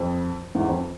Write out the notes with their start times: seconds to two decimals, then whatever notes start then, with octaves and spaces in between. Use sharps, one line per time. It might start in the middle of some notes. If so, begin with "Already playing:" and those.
Already playing: F2
0.55 E2 G#2
0.68 F2